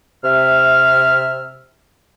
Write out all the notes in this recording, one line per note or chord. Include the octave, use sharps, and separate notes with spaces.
C3 E5 F6